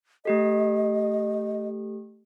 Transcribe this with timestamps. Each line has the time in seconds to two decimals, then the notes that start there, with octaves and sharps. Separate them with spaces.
0.25 A3 G4 A4 D#5